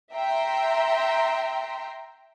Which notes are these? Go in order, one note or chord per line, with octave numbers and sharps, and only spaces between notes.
E5 G5 A#5 C6